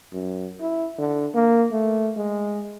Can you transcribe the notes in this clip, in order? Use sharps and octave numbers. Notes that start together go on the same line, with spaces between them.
F#2
E4
D3
A#3
A3
G#3